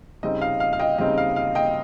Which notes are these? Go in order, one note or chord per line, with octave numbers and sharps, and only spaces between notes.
C#3 G3 C4 D#4 D#5
F5
F5
F5
D#5 G5
C#3 G3 C4 D#4 D#5
F5
F5
D#5 G5